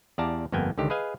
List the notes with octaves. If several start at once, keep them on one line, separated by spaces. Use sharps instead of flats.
E2 G4 D5 F5 A5 A#5
G1 F2 A#3 B3 G5 G#5
C#2 D3 D#3 G4
G#4 B4 D#5 F5 G#5